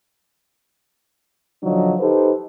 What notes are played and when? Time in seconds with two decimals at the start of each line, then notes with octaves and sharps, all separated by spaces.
1.63 D3 F3 F#3 D4 D#4
1.99 D#4 G4 A4 B4 C5